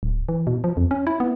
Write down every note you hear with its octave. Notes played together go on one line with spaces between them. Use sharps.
D1
E3
B2
F3
F2
C#4
E4
B3